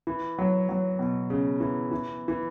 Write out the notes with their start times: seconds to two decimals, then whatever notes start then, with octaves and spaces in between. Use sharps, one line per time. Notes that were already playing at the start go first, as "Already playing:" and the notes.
0.07 E3
0.38 F#3
0.69 F#3
0.99 B2
1.30 C#3
1.60 E3
1.91 E3
2.28 E3